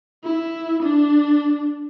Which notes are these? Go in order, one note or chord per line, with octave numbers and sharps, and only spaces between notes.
E4
D4